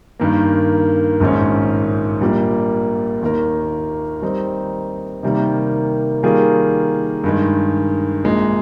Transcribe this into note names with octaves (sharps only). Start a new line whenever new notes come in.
G2 D#3 A#3
A#1 G#2 D#3 G#3 C#4
A#1 A#2 G3 A#3
D#2 D#3 A#3 D#4 A#4
D#3 G3 C4 D#4
C3 D#3 G3 A#3
D#3 G3 A#3 F4 G#4
G2 D#3 G#3
A#1 A#2 G#3